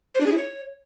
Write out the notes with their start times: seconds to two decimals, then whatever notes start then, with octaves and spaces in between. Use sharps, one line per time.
0.15 C5
0.20 D4
0.26 G#4
0.32 E4
0.37 C#5